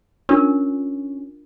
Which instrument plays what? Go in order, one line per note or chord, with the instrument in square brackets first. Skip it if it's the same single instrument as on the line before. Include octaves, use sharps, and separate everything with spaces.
[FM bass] C#4 [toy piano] D4 F4 A#4